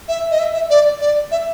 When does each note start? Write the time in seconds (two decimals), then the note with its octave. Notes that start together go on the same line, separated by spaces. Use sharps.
0.08 E5
0.31 D#5
0.39 E5
0.54 E5
0.70 D5
1.01 D5
1.31 E5